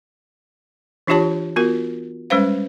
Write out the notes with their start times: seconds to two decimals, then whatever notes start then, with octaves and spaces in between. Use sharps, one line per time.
1.07 E3 D4 F4 G4 C#5 A5
1.56 B3 F4 F#4 A#4
2.30 G3 G#3 C#4 B4 C5 F5